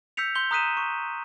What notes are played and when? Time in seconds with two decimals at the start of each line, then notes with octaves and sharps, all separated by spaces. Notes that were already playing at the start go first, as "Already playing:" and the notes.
0.17 E6 G6 B6 C#7 F7
0.35 C6 G6 G7
0.51 A#5 D#6 F#6 B6 D#7 E7
0.77 C#6